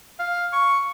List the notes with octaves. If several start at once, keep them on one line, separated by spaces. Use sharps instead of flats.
F5
C#6